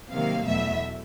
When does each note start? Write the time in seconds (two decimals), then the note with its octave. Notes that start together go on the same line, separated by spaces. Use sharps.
0.12 C3 D#3 F#3 A#3 F5
0.46 E2 B2 F#3 A3 E5